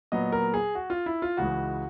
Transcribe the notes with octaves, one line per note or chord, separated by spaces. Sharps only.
A#2 F#3 B3 D#5
A#4
G#4
F#4
F4
E4
F4
C#2 C#3 E3 G#3 F#4